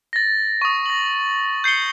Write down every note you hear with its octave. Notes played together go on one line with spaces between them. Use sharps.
A6 A#6
C#6 D#6
A#6 F#7
G6 C7 C#7 G7